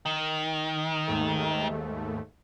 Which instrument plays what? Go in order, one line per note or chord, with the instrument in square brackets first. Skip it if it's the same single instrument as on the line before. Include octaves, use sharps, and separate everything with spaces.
[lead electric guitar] D#3
[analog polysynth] D#2 G#2 A3